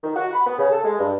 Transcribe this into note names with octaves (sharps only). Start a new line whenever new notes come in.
D#3
F#4
B5
B3
C#3
A4
G#3
G2